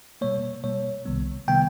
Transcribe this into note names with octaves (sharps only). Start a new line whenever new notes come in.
B2 G3 A#3 C#5
B2 G3 A#3 C#5
C2 C3 D#3 G3 B3
C3 D#3 G3 B3 G5